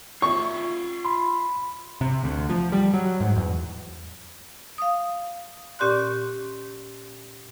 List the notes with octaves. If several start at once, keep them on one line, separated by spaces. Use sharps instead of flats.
F4 E5 C#6
B5 C6
C3
D2
F3
G3
F#3
G#2
E2
F5 D#6
A#2 C#4 G4 D5 C6 F#6